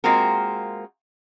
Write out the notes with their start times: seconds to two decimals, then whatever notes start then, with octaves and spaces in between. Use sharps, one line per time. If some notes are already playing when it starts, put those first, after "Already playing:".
0.04 G#3 A#3 C4 F4 F#4 A#4